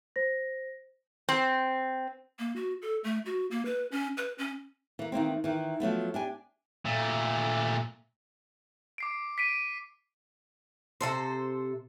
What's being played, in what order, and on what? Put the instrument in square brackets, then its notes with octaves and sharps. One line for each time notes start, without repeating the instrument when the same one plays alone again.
[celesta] C5 A#6
[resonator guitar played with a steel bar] C4
[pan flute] A#3
F#4
A4
A3
F#4
A#3
B4
C#4
B4
C#4
[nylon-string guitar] E3 A#3
D#3 E3 A#3 C4
D#3 E3
F3 F#3 A3 B3
D4 G4 G#5
[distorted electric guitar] A#2 A3
[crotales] D6 C7 D7
B6 C7 D7 D#7
[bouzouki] C3 E3 A4 C5